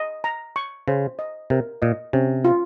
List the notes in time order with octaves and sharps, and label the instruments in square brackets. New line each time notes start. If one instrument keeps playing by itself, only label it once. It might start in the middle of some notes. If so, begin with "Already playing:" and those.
Already playing: [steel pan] D#5
A#5
C#6
[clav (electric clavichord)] C#3 [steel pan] C5
[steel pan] D#5
[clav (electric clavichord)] C3 [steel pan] A#4
[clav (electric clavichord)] A#2 [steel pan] D#5
[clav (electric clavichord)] C3 [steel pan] C#4
[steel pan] F4